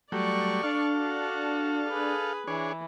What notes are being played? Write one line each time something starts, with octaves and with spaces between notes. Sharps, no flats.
F#3 G3 A3 D5 C#6
D4 A4 F5
F#4
G#4 B4
E3 D4 G#4 C#5